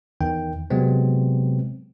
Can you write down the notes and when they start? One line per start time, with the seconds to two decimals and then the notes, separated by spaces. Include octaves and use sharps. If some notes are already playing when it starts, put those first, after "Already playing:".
0.21 E2 D#3 G5
0.70 C3 F#3 G#3 B3 C4